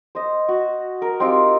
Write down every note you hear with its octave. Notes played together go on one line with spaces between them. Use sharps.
C5 D#5
F#4
A#4
C4 D#4 F4 G4